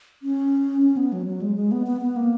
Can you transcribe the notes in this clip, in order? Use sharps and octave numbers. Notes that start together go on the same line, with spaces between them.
C#4
C#4
B3
F#3
F#3
G#3
G#3
B3
B3
B3
A#3